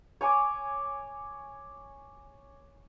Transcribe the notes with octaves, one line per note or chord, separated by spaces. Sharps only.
C#5 G#5 C#6 D6